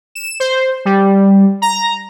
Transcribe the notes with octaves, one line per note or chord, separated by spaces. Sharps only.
E7
C5
G3
A#5